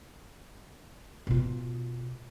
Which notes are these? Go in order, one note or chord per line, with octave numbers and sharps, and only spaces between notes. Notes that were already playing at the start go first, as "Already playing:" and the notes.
B2 F4